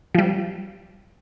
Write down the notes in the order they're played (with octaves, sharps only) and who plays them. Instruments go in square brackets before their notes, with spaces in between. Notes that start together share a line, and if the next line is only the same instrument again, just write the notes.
[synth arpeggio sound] F3 G3